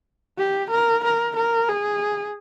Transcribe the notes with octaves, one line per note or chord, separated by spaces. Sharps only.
G4
A#4
A#4
A#4
G#4